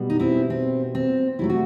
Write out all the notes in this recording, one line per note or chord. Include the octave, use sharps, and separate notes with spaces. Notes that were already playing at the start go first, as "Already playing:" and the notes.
Already playing: B2 G3 B3
D#4
C4 E4
C4
C4
C3 F#3 A3 E4
F#4